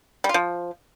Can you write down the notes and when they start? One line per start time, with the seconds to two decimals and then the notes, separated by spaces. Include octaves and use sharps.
0.24 G3
0.29 F4
0.34 F3